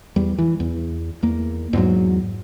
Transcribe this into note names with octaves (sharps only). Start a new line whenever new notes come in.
E2 G3
E3
E2
E2 A#3
E2 G#2 F#3